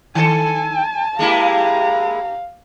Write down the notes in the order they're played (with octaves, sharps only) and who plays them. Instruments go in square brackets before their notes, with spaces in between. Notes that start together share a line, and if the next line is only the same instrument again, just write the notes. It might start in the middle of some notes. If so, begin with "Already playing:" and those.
[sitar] D#3 A4 [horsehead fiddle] G#5 [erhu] A5
[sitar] G#3 A#3 E4 [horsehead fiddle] G4 A#5 [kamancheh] F5